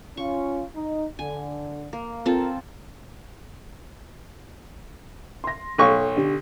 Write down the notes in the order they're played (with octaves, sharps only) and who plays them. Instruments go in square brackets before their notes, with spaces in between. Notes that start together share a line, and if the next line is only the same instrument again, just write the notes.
[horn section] C#4 F4 [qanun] C#6
[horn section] D#4
[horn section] D3 [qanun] G#5
[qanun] A#3
[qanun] C4 F4 A4 [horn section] A#4
[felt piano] C6 A#6
[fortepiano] B1 C#6 [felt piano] A4 C#5 F5
[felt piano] D3 G4